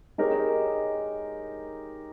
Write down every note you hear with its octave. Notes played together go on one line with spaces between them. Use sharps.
G#3 D#4 G4 A#4 C#5